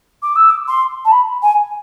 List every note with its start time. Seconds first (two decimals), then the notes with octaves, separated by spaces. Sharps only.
0.23 D6
0.36 E6
0.51 D6
0.68 C6
1.05 A5
1.12 B5
1.42 G#5